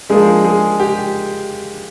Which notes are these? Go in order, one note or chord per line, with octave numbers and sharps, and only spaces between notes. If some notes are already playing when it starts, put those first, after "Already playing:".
F3 G#3 A#3 D4 G#4
G#3 G#4
G4